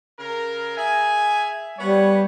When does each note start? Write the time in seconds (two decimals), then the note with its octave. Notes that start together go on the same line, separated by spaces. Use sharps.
0.18 C#3 A#4
0.77 G#4 E5 G#5
1.79 G3 B3 C#5